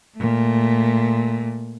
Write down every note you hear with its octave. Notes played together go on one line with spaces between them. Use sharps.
A#2 A3